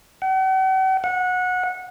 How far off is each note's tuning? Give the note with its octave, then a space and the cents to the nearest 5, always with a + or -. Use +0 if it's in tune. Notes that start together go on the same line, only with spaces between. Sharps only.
F#5 +45
F#5 -20